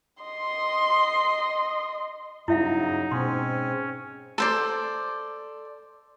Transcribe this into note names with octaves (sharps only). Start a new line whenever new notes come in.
D#5 C6
G2 C#3 F#3 D#4 E4 E5 F5
G#2 B2 C4 C#4 G#5 C6
A4 C5 D5